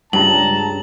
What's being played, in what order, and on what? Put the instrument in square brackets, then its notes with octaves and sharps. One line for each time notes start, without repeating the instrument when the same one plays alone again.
[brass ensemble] C#2 A5 A#5 [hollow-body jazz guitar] G2 [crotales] F#7